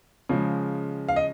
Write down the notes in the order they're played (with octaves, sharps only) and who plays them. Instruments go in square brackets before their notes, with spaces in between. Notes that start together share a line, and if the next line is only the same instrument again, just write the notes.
[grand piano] C#3 F3 G#3
F5
D#5